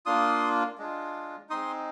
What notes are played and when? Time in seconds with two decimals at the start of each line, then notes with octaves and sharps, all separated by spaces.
0.06 A#3 D4 F4 C6 D#6
0.78 G#3 D4 F4
1.50 G#3 C4 D#4 C6 D#6